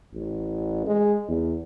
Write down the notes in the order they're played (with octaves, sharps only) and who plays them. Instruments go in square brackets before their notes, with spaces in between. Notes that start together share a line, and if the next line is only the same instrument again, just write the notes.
[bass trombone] A1
G#3
E2